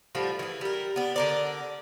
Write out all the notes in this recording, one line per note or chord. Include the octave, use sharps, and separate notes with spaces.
A2 F3 G3 F#4
E3 G#4
G3 A#4
B3 D4
D3 A#4 D5